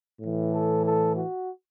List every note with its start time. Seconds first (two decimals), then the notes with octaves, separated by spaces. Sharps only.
0.21 A2 E3
0.53 A4
0.85 A4
1.16 F#4